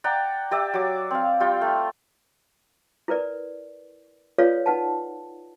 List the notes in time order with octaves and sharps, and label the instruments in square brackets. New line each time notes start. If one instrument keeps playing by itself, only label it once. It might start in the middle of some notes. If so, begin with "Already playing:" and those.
[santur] D5 F#5 G5 A#5
G4 D5 E5
F#3 D6
C4 F5
G3 F4 G5
A3
[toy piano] E4 A#4 B4 D5
F4 A4 B4 C#5 D5 F5
D#4 B4 F#5 A5